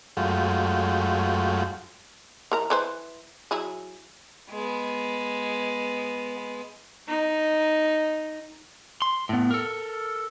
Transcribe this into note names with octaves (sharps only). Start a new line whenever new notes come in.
F#2 G#3 A3 F4 F#4 G5
E3 A#4 A#5
E3 B4 C5
F#3 E4 G#4
G#3 B3
D#4
C6
A2 B3
A4 A#4